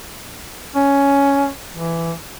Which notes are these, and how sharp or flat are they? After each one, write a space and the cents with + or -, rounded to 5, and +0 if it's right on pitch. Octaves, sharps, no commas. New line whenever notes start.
C#4 +10
E3 +15